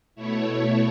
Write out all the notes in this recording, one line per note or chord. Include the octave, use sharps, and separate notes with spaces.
B2 A3 E4 C#5